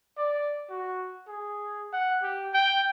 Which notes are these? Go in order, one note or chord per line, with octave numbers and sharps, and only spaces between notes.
D5
F#4
G#4
F#5
G4
G5